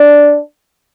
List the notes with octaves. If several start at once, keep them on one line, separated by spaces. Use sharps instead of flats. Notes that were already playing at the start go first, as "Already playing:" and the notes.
Already playing: D4